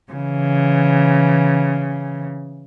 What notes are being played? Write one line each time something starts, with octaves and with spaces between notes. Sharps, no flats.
C#3 E3